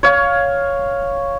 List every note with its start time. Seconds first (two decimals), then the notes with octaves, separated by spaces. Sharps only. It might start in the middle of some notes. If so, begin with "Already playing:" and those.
0.03 C#5 F5